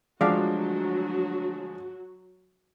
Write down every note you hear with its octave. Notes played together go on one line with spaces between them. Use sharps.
D2 F3 F#3 G#3 F#4 D5 F5 F#5